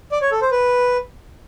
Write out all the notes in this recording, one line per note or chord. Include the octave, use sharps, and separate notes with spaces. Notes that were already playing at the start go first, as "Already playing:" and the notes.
D5
C#5
A4
C5
B4